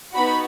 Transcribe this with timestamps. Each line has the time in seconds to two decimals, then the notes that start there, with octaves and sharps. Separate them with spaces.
0.14 B3 D#4 F#4 B5